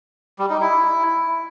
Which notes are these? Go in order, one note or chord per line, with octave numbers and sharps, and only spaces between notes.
G3
D#4
E4